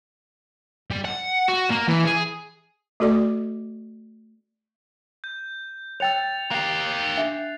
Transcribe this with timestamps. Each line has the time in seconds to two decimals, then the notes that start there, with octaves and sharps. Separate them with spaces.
0.91 G3
1.05 F#5
1.49 F#4
1.71 A#3
1.88 E3
2.05 G#4
3.00 A3 F#4 A4 D5 D6
5.24 G6
6.00 C#5 G5 E6 A6 C#7 F7
6.51 A#3 G4 F#6 C7
7.17 D4 E5